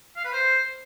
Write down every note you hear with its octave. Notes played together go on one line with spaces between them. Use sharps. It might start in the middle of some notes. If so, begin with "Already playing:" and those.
F5
B4
C5